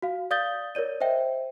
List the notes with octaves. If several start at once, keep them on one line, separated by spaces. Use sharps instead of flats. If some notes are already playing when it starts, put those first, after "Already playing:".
F#4 F5
D5 F5 D#6 G6 A6 G7
A#4 C#5 D5 D#7
C5 D#5 E5 G5